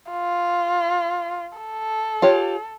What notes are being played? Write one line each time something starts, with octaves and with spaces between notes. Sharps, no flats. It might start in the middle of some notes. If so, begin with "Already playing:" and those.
F4
A4
F4 G4 C#5